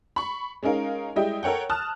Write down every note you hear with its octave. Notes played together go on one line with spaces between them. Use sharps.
B5 C#6
G#3 C#4 D#4 A#4 F5
G3 G#3 E4 G4 D#5 G5
A4 A#4 C#5 F#5 G5
A5 D#6 F6 F#6